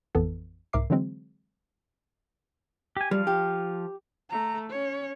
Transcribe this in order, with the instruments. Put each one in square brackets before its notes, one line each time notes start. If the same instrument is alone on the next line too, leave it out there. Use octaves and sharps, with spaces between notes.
[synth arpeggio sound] A1 F2 E3 B3 A4
C2 G#2 A#4 E5 D6 C7
D3 E3 F#3 G#3 C4
[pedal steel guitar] G4 G#5
[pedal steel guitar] F3 F5 [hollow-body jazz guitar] G3
[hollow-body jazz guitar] G4
[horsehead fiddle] A3 A#5
C#4 C#5